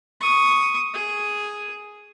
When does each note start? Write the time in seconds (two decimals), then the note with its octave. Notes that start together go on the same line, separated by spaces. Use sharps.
0.20 C#6 D#6
0.94 G#4